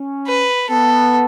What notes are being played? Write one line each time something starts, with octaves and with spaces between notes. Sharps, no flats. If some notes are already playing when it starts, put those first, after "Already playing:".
Already playing: C#4
B4
B3 A4